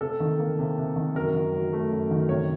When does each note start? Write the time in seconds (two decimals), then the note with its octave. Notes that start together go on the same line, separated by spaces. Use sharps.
0.01 C3 A4
0.20 D#3
0.39 A#3
0.59 C3
0.78 C3
0.96 D#3
1.15 F#2 A#4
1.35 D#3
1.53 F#3
1.73 A3
1.92 F#2
2.11 D#3
2.29 C3 C#5